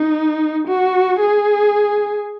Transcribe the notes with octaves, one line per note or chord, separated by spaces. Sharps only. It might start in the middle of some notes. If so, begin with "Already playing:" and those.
Already playing: D#4
F#4
G#4